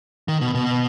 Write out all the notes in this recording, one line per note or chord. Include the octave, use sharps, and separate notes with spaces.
D#3
B2
B2